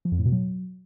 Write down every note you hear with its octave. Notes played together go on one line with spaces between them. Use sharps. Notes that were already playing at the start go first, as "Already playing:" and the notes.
F3
F2
A2
B2
F#3